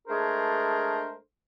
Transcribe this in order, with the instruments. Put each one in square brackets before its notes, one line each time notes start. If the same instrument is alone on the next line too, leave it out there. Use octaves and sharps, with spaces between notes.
[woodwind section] G#3 A3 D4 G#4 A#4 C5